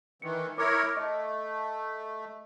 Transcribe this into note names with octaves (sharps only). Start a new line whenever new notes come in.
D#3 E3 C#7
E4 A#4 C#5 D6 F6 A#6
A3 D#5